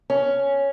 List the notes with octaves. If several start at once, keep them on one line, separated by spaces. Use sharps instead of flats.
C#4